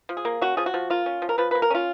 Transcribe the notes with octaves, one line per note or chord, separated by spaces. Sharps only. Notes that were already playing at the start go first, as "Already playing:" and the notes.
F3
G#4
A#3
C#4 F#4
F3 G#4
F#4
F3
A#3 F4
C#4
F3
A#4
F3 B4
A#3 B4
A#4
C#4 F4